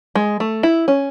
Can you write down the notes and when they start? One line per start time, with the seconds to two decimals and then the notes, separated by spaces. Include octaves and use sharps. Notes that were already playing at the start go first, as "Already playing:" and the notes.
0.15 G#3
0.40 A3
0.63 E4
0.88 C#4